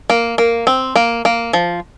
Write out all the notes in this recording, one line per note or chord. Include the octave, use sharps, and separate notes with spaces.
A#3
A#3
C4
A#3
A#3
F3